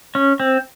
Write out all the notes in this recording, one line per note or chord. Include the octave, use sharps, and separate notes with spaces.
C#4
C4